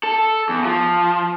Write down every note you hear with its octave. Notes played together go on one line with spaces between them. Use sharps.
A4
E2
F3